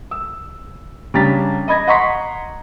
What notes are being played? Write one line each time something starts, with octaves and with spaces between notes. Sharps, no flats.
E6
C#3 G3 D4 A#5 A6 B6
D#5 B5 G#6 A#6
D#5 F#5 A#5 C6 C#6 B6